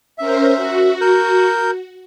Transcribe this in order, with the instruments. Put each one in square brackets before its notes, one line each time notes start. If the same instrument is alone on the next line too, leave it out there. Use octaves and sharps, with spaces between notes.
[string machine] C#4 A#4 C5 [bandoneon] E5
[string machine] F#4
[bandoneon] A#4 G6